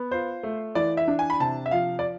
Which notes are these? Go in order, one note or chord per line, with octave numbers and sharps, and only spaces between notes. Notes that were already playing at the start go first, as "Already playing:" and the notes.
Already playing: B3
F4 C5
A3
E3 D5
E5
D4
G#5
B5
C3 A5
E5
F3 F5
D5